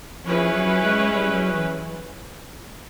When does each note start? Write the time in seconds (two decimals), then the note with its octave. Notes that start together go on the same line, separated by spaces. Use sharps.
0.25 F3 C#4 E4 G#4 B4
0.53 F#3
0.83 G#3
1.12 G3
1.32 F#3
1.54 E3